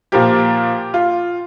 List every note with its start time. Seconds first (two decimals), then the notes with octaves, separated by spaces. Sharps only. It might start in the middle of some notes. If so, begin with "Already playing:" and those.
0.12 A#2 F3 A#3 G4
0.94 F4